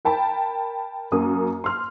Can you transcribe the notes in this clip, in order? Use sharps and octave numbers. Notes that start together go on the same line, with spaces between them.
A#4 G5 A5 B5
F#2 A#3 D#6
C6 F6